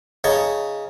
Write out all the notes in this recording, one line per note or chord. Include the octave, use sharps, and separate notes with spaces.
C#3 D#4 C#5 A5 C#6